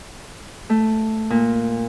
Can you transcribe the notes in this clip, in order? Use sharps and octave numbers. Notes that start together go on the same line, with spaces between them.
A3
A#2